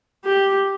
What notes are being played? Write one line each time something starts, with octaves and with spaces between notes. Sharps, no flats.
G4